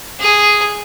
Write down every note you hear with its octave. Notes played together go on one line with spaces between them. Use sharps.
G#4